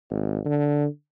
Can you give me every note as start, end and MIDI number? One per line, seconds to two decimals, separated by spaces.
0.11 0.39 32
0.46 0.86 50